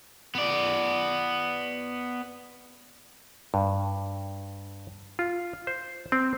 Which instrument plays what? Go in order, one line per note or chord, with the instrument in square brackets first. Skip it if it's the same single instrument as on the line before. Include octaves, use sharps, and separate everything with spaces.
[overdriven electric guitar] B3 D5
[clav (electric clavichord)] G2
F4
C5
C4